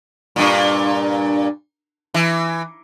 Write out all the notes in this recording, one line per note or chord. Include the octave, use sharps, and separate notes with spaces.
G2 A#2
E3